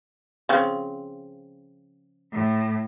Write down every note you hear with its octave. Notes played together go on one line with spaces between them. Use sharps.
C#3 F3 C4
A2